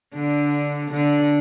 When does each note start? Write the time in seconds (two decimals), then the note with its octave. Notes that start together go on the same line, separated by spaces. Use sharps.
0.14 D3 D4
0.90 D3 D4